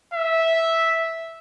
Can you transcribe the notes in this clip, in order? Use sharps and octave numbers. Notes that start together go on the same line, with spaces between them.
E5